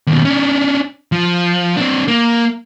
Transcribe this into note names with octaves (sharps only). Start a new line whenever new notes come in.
D#2 B2
C#4 D4
F3
C4 D4
A#3